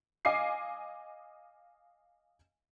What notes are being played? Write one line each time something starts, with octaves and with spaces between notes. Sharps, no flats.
D#5 F5 G#5 D6 C7